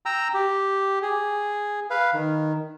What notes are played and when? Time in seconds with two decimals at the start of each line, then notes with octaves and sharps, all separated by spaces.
0.06 G5 A#5 E6
0.34 G4
1.02 G#4
1.90 B4 F5
2.14 D#3